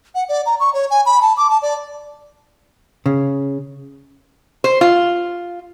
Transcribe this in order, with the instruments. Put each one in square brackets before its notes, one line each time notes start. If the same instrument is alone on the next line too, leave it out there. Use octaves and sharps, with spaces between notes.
[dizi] F#5
D5
A#5
C#6
C#5
G#5
B5
A5
D6
A5
D5
[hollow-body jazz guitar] C#3
[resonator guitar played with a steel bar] C5
F4